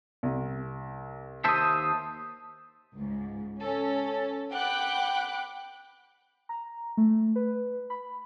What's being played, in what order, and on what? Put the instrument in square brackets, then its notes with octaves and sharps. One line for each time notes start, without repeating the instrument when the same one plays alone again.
[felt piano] C2
[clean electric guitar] D#2 C5 E5 [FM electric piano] A5 D#6
[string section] C#2 G#2
C#4 A4
F#5 G5 B5 D6 F#6
[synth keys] A#5
A3
B4
B5